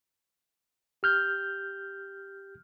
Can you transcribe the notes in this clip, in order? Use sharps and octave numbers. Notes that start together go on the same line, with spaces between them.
G4 F6 G6